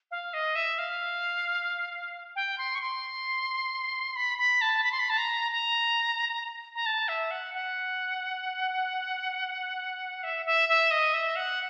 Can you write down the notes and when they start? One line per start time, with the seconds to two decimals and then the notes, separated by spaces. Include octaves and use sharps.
0.11 F5
0.34 D#5
0.56 E5
0.78 F5
2.36 G5
2.58 C6
2.75 C#6
2.81 C6
4.16 B5
4.38 B5
4.61 A5
4.84 B5
4.92 C6
4.99 B5
5.10 A5
5.18 A#5
5.51 A#5
6.75 A#5
6.86 A5
7.08 E5
7.31 F#5
7.54 F#5
10.23 E5
10.46 E5
10.69 E5
10.91 D#5
11.14 E5
11.36 F#5